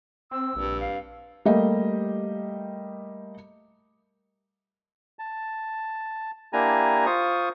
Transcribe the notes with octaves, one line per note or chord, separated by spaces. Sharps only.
C4 E6
A#1 G2
F5
G3 A3 A#3 G4 D#5
A5
A#3 D4 E4 G4 G#5 A#5
F4 C5 C#6 D#6